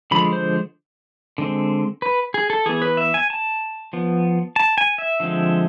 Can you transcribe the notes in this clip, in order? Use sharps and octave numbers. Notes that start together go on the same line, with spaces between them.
D3 F3 G#3 B5
C5
D3 G#3 C4
B4
G#4
A4
E3 B3 G#4
B4
E5
G#5
A5
F3 B3
A5
G#5
E5
D3 F3 G#3 C4